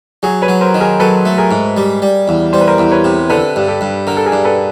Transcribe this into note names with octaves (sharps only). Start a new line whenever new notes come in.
F#3 F#4 G#4
B4 C#5
F#3
A#4 C5
D#3
G#4 A#4
F#3 A4 B4
A3
G#4 A#4
G#2
G3
G3
E2
G3 C5
B4
A#4 C5
E2
B4 C#5
C3
D3 A4 B4
G2
G4 A4
G2
D3 A#4
A4
G#4 A#4
G2
A4 B4